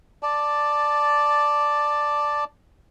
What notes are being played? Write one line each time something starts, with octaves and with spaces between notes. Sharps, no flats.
D5 A5